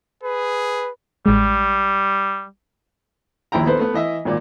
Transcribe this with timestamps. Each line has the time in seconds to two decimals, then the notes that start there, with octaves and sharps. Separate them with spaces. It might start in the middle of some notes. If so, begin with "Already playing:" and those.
0.23 G#4 B4
1.26 A1 G3 G#3
3.52 A#1 D#2 E4 G5 A#5
3.67 B3 A4 B4 C5
3.79 A3 B3 B4
3.94 E3 D#5 E5
4.25 G#1 A#2 D5